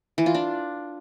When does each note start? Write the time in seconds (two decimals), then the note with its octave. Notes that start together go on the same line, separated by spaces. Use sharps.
0.18 E3
0.26 F4
0.35 D4